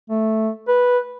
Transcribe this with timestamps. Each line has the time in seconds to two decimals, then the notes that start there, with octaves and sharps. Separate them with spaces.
0.10 A3
0.68 B4